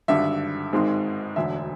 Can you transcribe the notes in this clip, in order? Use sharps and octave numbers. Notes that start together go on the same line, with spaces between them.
G#1 G2 D3 E5
G#1 G#2 D#3 G#3 C4
E1 D2 D3 E5